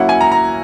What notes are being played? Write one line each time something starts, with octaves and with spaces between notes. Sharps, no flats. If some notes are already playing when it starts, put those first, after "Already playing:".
Already playing: F#3 A#3 C#4 E4 F#5
G#5
A#5
A#5